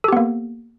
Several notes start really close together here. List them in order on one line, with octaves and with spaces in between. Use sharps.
A4 G4 B3 A#3